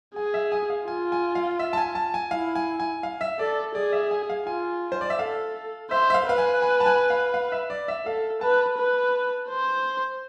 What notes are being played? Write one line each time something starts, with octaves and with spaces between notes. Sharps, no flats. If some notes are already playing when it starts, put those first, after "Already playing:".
G#4 G#5
E5
G#5
F5
F4 G#5
G#5
F5
E5
A5
G#5
A5
G#5
E4 F5
G#5
G#5
F5
E5
A4 D5
G#4 D5
E5
G#5
F5
F4 G#5
C5
D5
E5
A4 F5
C5 E5
E5
F5
B4 F5
G#5
G#5
A5
G#5
F5
F5
E5
D5
E5
A4 F5
B4 A5
B4
C5